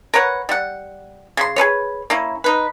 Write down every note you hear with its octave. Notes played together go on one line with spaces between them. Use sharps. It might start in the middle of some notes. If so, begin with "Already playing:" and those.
A#4 B4 C#5 F#5
G3 F#5
C#3 F#4 C6
G#4 A4 B4 C#5
A#3 C#4 E4
D#4 B4